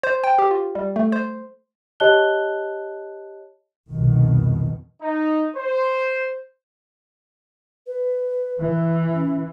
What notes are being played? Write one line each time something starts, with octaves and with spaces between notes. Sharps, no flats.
C5
G5
G4
F4
G3
A3
C5
G4 C#5 D#5 A5 F#6 G7
C2 F2 B2 D#3
D#4
C5
B4
E3
C#4